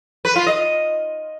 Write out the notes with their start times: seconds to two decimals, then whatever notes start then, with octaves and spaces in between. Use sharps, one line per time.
0.25 B4
0.36 F4
0.47 D#5